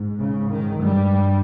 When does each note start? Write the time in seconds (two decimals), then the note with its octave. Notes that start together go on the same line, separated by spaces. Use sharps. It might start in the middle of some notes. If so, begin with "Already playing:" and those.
Already playing: G#2
0.20 C#3
0.51 D#3
0.81 G2 G3